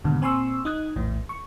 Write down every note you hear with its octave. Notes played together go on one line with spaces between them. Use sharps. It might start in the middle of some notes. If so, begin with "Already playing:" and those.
D#2 G#2 B2 D3
A#2 C4 G#5 C6 C#6 E6
D#4 D#6 F#6 G#6
A#1 E2 A2 E3
C#6